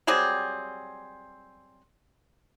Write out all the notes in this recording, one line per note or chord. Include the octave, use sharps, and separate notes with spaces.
F#3 G3 C4 G#4